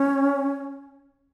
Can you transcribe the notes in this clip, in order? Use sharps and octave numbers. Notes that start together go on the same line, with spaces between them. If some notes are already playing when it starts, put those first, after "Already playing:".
Already playing: C#4